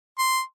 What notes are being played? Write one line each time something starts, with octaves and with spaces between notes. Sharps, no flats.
C6